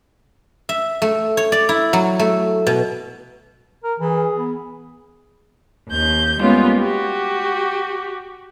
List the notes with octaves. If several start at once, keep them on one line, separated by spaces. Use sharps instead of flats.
E5
A3
C#5
D5
E4
F#3
A3
B2
A#4
E3 G#4
B3
D#2 G6
G3 G#3 A#3 B3 C#4 F4
F#4 G4